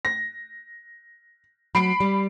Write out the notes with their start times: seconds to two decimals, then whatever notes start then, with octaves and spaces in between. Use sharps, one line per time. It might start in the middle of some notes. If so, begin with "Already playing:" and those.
0.05 A#6
1.75 F#3 B5 C7 D7
2.00 G3